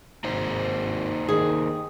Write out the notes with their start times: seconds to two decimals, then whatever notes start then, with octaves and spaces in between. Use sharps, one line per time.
0.24 G#1 A#3 D#4 C5
1.29 D#3 G#4